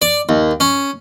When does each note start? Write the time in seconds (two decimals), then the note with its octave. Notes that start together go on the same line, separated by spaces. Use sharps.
0.02 D5
0.29 D#2
0.60 C#4